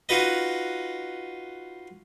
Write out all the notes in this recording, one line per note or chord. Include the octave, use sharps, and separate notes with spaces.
D#4 F4 F#4 B4 D#5